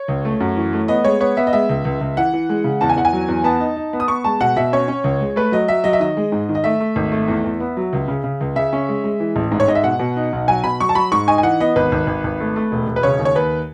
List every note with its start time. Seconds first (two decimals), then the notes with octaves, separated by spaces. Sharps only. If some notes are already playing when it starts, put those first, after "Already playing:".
Already playing: C#5
0.08 C#2
0.25 A3
0.40 F#2
0.56 E3
0.73 A3
0.88 B3 D#5
1.05 G#3 C#5
1.20 B3 C#5
1.37 B3 E5
1.47 D#5
1.53 G#3 E5
1.69 C#2
1.85 C#2
2.01 C#2
2.17 E3 F#5
2.33 E3
2.49 G#3
2.64 C#3
2.81 E2 A5
2.89 G#5
2.96 E2 F#5
3.05 G#5
3.13 F#3
3.28 E2
3.44 B3 A5
3.60 D#4
3.76 D#4
3.93 B3
4.00 D#6
4.08 B3 C#6
4.24 G#3 A5
4.41 B2 F#5
4.56 B2 E5
4.73 C#4 C#5
4.88 C#4
5.04 C#2
5.21 G#3
5.36 A3 B4
5.52 F#3 D#5
5.68 F#3 E5
5.84 F#3 D#5
5.93 E5
6.00 D#3 D#5
6.17 G#3
6.32 G#2
6.49 D#3
6.55 D#5
6.64 A3 E5
6.80 A3
6.96 G#1
7.12 A3
7.28 E2
7.44 E2
7.60 B3
7.77 F#3
7.93 C#2
8.08 C#3
8.24 C#3
8.41 C#2
8.56 C#3 E5
8.73 C#4
8.89 G#3
9.04 G#3
9.20 E3
9.36 A1
9.51 G#2
9.60 C#5
9.68 G#2 D#5
9.75 E5
9.84 B2 F#5
9.99 B2
10.16 D#4
10.33 B1
10.48 F#3 G#5
10.64 B2 B5
10.80 F#3 C#6
10.89 A5
10.95 F#3 B5
11.12 G#2 C#6
11.28 D#4 G#5
11.38 G#5
11.43 E3 F#5
11.60 B3 D#5
11.76 G#1 B4
11.92 G#1
12.07 G#1
12.24 G#1
12.40 A3
12.56 A3
12.72 E1
12.88 E1
12.96 B4
13.03 C#3 C#5
13.19 D#2
13.25 C#5
13.35 D#2 B4